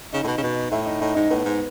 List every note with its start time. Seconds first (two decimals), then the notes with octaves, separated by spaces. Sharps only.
0.13 C#3 D#4
0.24 A2
0.27 B2
0.38 C#3
0.42 B2
0.71 A2 E4
0.86 D#4
1.01 A2 D#4
1.15 G#2 D#4
1.30 A2 B3
1.45 G#2